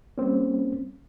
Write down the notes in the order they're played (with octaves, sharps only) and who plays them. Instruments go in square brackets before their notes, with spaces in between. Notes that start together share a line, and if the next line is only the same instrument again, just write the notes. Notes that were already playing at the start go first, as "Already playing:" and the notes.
[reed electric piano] G3 A#3 C4 C#4